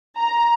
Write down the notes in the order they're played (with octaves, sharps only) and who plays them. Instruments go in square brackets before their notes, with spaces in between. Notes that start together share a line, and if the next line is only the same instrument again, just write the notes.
[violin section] A#5